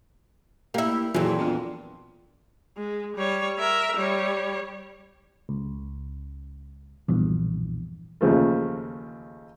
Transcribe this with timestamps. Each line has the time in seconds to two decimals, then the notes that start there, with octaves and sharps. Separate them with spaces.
0.74 A#3 E4 G4
1.14 F2 A#2 E3 F#3 G#4
1.39 B3 D4 F4
2.77 G#3
3.16 G3 C#5
3.59 A#4 E5
3.97 G3 C#5
5.49 C#2
7.08 B1 E2 G2 A#2 F3
8.21 D#2 C#3 F3 A3